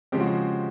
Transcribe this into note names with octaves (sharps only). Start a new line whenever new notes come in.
C#3 F3 G#3 C4 G4
F#4